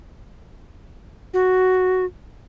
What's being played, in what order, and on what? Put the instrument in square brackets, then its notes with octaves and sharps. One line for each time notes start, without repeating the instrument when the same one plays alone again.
[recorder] F#4